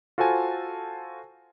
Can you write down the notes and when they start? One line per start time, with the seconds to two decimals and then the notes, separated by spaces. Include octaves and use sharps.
0.18 F4 F#4 A4 C5 G#5 A5